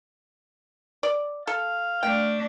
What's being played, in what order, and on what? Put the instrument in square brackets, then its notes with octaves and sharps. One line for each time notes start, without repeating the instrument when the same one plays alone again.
[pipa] D5
[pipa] A4 [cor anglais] F5
[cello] A3 D4 [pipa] G5